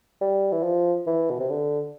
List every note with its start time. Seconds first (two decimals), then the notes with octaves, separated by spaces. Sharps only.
0.21 G3
0.52 E3
0.63 F3
1.07 E3
1.30 B2
1.40 C3
1.50 D3